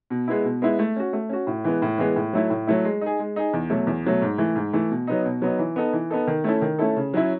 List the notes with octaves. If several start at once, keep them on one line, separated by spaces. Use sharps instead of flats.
B2
G#3 B3 E4
B2
G#3 B3 E4
A3
C#4 F#4
A3
C#4 F#4
A2
E3 G#3 B3
A2
E3 G#3 B3
A2
F#3 A3 E4
A2
F#3 A3 E4
G#3
D#4 G#4
G#3
D#4 G#4
E2
B2 F#3 A3
E2
B2 F#3 A3
G#2
E3 A3
G#2
E3 A3
B2
F#3 B3 D#4
B2
F#3 B3 D#4
E3
B3 D#4 A4
E3
B3 D#4 A4
D#3
A3 C#4 E4 A4
D#3
A3 C#4 E4 A4
C#3
F#3 C#4 E4